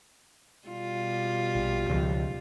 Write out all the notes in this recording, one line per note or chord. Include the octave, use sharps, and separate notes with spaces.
B2 G3 F4
A#1
C#2 F3